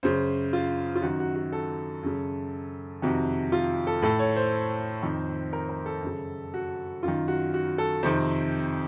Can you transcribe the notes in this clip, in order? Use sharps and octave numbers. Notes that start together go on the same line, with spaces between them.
F#2 C#3 C5
F4
F4
F#2 D#3 F#4
F#4
F#4
A4
F#2 C#3
F2 C3 D#3 F#4
F4
A4
A2 A4
C#5
C5
F2 D#3
A#4
A#4
A4
F#2 C#3
F#4
F#2 D#3 F4
F#4
F#4
A4
F2 C3 D#3 C5